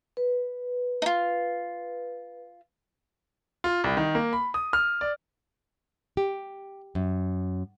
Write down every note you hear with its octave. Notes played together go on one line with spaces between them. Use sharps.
B4
D#4 F4
F4
C2
D#3
A#3
B5
D#6
F6
D5
G4
F#2